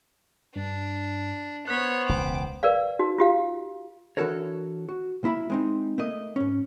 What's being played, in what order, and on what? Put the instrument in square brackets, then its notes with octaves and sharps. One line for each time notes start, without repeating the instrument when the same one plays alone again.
[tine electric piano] G2 [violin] D4
[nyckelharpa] B3 C5 [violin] C#5 [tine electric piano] F#6 B6
[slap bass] E1 C#2 [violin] D6
[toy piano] A#4 B4 D5 F5
D#4 F#4
F4 G4 F5
[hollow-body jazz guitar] E3 D4 F#4 A4 A#4 C#5
F#4
B1 A#3 E4 E5 B5
G#3 C4 D#4
A3 A#3 D#5
G#2 C#4